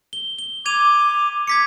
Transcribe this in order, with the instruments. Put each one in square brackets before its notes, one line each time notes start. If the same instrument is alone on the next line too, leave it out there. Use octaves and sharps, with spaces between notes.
[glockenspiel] G7
G7
[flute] D6 [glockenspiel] G#6 D#7 F7
[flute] D6 [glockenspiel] G#6 B6 C#7